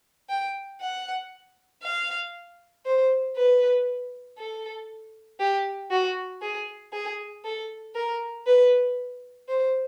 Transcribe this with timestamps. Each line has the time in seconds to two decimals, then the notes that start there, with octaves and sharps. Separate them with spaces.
0.29 G5
0.80 F#5
1.83 F5
2.86 C5
3.36 B4
4.38 A4
5.40 G4
5.91 F#4
6.42 G#4
6.93 G#4
7.45 A4
7.95 A#4
8.47 B4
9.48 C5